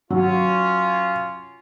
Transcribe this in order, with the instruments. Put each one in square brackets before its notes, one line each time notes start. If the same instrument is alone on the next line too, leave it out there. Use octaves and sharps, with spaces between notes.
[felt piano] F#3 [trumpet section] C#4 F4